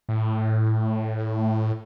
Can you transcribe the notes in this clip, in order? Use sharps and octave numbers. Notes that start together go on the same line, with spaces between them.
A2